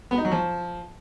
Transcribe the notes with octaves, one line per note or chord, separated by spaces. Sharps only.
B3
D#4
F#3
F3